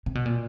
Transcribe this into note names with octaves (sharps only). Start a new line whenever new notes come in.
C3
B2
A#2